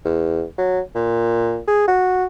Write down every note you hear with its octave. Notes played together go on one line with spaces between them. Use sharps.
E2
F#3
A#2
G#4
F#4